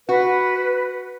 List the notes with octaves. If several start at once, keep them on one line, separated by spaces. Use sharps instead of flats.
F#4 B4